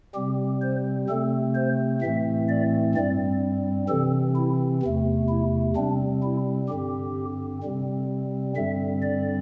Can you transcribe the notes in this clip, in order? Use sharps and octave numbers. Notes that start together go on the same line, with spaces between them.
C3 G3 C4 G4
C5
C3 A3 C4 A4
C5
A2 E3 A3 C4 E5
D5
G2 G3 C4 D5
C3 E3 C4 A4
E4
E2 C3 A3
E4
C3 G3 C4 D4
E4
G2 D3 C4 G4
C3 G3 C4
G2 D3 G3 C4 E5
D5